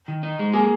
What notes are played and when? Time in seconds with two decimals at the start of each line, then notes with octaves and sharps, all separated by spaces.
0.08 D#3
0.23 D#4
0.39 G#3
0.53 A#3 G#4